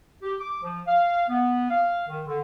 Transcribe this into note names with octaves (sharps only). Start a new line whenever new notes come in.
G4
D6
F3
F5
B3
F5
D#3
D3